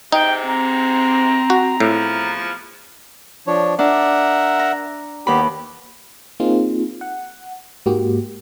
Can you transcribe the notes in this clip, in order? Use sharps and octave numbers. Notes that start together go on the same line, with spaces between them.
G#2 C3 D#4 G5
C4 A#5
F#4
E2 A2 F3
F3 D4 C#5
D4 A#4 E5 F#5
A#5
D#2 B3 G4 B5
A#3 C4 D#4 F4 G#4
F#5
G#2 A#3 F#4 G4